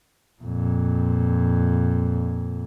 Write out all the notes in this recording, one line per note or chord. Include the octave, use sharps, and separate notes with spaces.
F2 A#2